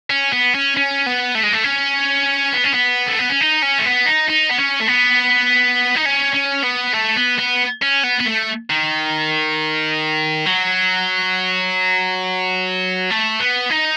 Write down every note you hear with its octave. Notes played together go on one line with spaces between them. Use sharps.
C#4
B3
C#4
C#4
B3
A3
G#3
A3
C#4
B3
C#4
B3
A3
B3
C#4
D#4
C#4
A3
B3
D#4
D#4
B3
C#4
A3
B3
D#4
C#4
C#4
B3
A3
B3
B3
C#4
B3
B3
A3
D#3
F#3
A3
B3
D#4